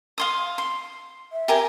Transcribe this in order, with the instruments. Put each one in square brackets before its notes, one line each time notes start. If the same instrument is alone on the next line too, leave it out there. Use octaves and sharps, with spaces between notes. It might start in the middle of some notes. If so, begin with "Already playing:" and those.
[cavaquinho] F5 C6 D#6
C6
[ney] E5
[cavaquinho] G4 A#4 G#5